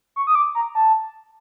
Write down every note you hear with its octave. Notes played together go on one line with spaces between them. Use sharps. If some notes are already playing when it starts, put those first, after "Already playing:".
C#6
D#6
D6
A#5
A5